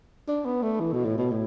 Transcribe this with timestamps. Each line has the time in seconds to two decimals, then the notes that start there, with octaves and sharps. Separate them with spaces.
0.28 D4
0.46 B3
0.62 A3
0.80 E3
0.93 B2
1.05 A2
1.18 B2
1.31 A2